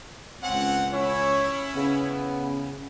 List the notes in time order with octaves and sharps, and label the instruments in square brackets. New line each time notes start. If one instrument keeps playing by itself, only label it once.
[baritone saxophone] C#2 [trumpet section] C4 C#4 F#5
[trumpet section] C#4 E4 [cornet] C#5
[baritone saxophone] C#3 [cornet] B3